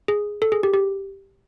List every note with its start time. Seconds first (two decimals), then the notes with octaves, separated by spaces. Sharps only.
0.08 G#4
0.42 A4
0.52 G#4
0.63 G4
0.74 G4